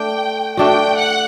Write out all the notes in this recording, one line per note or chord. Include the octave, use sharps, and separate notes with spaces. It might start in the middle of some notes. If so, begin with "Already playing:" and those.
Already playing: A3 D4 G5
A3 D4 F#4 G5
F#5